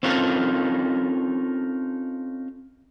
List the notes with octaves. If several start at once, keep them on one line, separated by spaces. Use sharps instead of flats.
C4 C#4 D#4 F4 A4 A#4